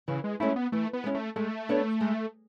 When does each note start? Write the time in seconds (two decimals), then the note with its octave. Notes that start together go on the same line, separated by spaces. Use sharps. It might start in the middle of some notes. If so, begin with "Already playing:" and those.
0.08 C#3 E3
0.24 G#3
0.40 G#3 A3 C#4 E4
0.56 B3
0.72 E3 A3
0.93 B3
1.04 G#3 C#4 E4
1.15 A3
1.36 G#3 A3
1.69 B3 D4 A4 C#5
2.01 G#3